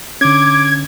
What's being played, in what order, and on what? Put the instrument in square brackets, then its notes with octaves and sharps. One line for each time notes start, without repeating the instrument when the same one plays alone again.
[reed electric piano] D3 C#4 [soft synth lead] D6 [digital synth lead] G#6